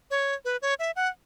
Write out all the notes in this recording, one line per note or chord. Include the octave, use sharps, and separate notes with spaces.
C#5
B4
C#5
E5
F#5